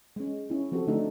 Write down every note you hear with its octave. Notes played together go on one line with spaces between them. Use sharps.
G#3 C#4
C#4 E4
F3 C4 F#4 G4 A4
D3 A3 D4 D#4 A4